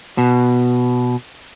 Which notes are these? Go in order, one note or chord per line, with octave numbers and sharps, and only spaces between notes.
B2